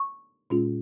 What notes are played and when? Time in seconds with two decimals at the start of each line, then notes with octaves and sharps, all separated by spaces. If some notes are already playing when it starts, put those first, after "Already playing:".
Already playing: C#6
0.50 A#2 G#3 C#4 F4